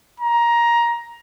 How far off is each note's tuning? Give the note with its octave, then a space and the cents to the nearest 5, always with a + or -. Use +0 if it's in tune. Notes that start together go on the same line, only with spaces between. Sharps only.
A#5 +15